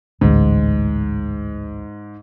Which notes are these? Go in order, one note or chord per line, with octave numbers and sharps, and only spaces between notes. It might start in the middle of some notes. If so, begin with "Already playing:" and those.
A1 D2 G#2